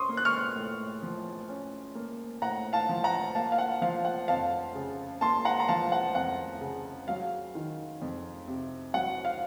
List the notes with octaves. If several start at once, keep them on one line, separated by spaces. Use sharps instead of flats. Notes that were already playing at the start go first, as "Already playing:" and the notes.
Already playing: C#4 C6 C#6 D#6
A#3
F#6
C#6 F6
A2
F3
C#4
A#3
A2 F#5 A#5
F5 A5
F3
F#5 A#5
A#3 F5 A5
F5
F#5
F3 F5
F#5
F2 F5 A5
C#3
A#3 A5 C6
F#5 A#5
A#5
F3 F5 A5
F#5
F2 F#5
C#3
F#3 F5
D#3
F2
C3
F#3 F#5
F5